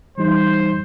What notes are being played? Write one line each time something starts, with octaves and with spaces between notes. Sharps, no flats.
E3 G3 D#4 C5